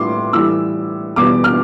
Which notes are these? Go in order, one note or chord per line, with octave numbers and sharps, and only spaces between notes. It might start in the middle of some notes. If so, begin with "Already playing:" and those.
Already playing: A2 G3 C6 D6
A2 E3 G3 E6
E2 B2 G3 D6
F6